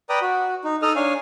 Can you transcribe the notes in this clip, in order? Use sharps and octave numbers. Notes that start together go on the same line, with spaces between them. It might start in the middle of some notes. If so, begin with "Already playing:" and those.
B4 D5 G5 A#5 D#6
F#4
D#4
D#4 A4 D#5 D#6 F6
D4 C#5 F5 G#5